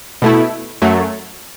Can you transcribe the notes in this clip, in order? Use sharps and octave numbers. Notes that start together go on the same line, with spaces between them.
B2 A3 E4
F#2 F#3 A3